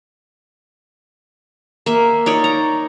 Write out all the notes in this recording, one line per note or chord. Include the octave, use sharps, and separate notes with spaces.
A#3 E5
D#4 C#5 D5
A#5